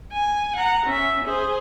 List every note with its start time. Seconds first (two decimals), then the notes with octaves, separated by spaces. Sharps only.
0.13 G#5
0.56 F#5 A#5
0.86 C#4 E5
1.24 G#4 C5